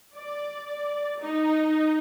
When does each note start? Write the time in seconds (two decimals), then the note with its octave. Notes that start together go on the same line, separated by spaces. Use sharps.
0.15 D5
1.21 D#4